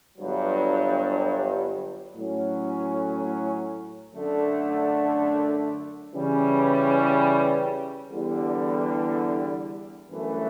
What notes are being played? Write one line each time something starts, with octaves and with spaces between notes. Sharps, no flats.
G1 G2 F#3
A2 F#3 C#4
F#2 D3 A3 D4
C#3 E3 G3 C#4
E2 D3 G3
G1 F#2 E3 A3